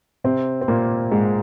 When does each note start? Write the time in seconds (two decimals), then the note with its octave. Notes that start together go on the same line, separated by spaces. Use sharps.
0.24 C3 C4
0.61 C4
0.68 A#2 A#3
1.11 G#2 G#3